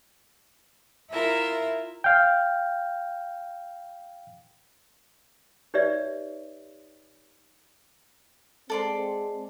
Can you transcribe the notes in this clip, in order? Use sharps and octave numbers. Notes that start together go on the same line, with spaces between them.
E4 F4 A#4 E5
F5 G5
D#4 G4 B4 C#5 D5 E5
G#3 C4 A4 D5 C6